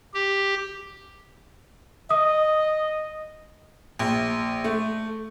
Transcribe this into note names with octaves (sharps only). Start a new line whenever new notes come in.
G4
D#5 D#6
A#1
A3